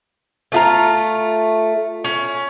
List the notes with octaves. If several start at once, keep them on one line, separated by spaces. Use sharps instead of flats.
A3 F4 A#5
C#4